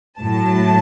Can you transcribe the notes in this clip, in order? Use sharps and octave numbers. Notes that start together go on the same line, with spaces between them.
A2 F#3 A5